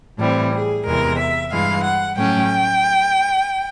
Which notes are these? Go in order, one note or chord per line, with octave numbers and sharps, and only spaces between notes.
A2 E3 G3 C4
G#4
E2 C3 E3 G#3 A#4
E5
G2 E3 G#3 F5
F#5
A2 F#3 A3 C#4 G5